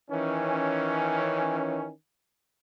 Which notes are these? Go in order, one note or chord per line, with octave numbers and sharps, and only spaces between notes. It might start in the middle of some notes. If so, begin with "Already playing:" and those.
D#3 E3 C#4